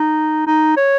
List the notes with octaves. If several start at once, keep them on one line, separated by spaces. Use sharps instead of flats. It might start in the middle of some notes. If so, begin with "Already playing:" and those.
Already playing: D#4
D#4
C#5